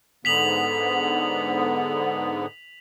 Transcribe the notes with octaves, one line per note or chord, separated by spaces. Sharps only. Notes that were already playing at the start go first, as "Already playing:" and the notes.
G#2 D3 B3 B6 F7 F#7